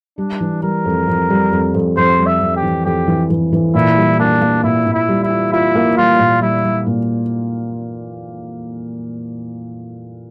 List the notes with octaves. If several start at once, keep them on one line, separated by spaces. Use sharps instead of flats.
G3 D4
E3
G3 A#4
F2
F2
G3
F2
F2
F2 C5
G3
E5
F2
G4
E3
F2 G4
E3
E3
E3
A#2 E4
G3
A#3 D4
A#3
A#2 E4
A#2
E4
G3
E4
F4
E4 F4
A#3
G3 F4
A#2
G3 E4
G3
A#2